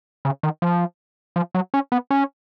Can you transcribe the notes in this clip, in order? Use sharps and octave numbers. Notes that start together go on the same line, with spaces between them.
C#3
D#3
F3
F3
F#3
C#4
B3
C#4